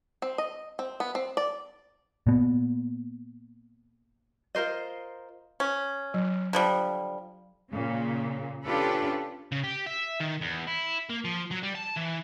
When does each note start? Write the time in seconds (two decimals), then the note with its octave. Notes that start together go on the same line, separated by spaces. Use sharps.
0.22 C4
0.38 D#5
0.79 C4
1.00 B3
1.15 C4
1.37 D5
2.27 A#2 B3
4.55 F4 A#4 C5 D#5
5.60 C#4
6.14 F#3
6.53 D3 F3 G3
7.72 A#2 C#3
8.64 C#4 D4 F4 G4 A4 B4
9.52 C#3
9.64 G4
9.86 E5
10.20 D#3
10.41 E2
10.67 E4
11.10 A#3
11.25 F3
11.51 F#3
11.63 G3
11.75 A5
11.97 E3